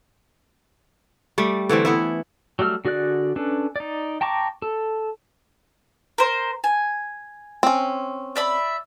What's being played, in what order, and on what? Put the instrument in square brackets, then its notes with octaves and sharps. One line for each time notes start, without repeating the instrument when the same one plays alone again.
[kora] G3 A3 D5
D3 E3 A3 C4
B3 E4 E5
[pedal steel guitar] F#3 G3 A3 E6 F6
D3 F#4 G#4 D5 F#6
C#4 D4 A4 B4
D#4 D5
G5 A5 A#5 C#6 D6
A4
[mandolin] A#4 C5
G#5
[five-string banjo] C4 C#4
[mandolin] D5 E5 B5